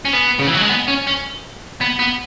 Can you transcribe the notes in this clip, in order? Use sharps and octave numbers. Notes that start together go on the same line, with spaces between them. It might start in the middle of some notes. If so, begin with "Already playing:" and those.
C#4
B3
C#3
E3
F#3
G#3
B3
C#4
C#4
B3
B3